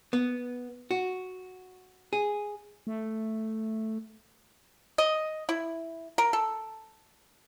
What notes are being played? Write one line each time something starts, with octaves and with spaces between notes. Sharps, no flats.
B3
F#4
G#4
A3
D#5
E4
A#4
A4